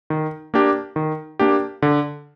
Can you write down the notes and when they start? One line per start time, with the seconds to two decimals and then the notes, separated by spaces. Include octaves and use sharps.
0.10 D#3
0.54 A#3 D4 G4
0.96 D#3
1.39 A#3 D4 G4
1.82 D3